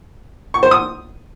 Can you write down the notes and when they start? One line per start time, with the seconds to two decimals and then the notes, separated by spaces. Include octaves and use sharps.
0.54 C#6
0.63 C5
0.71 D#6